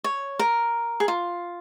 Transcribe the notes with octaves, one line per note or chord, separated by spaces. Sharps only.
C#5
A#4
G#4
F4